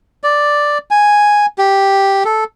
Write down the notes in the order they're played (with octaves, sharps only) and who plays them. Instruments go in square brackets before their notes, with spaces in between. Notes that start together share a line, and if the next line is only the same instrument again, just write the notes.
[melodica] D5
G#5
G4
A4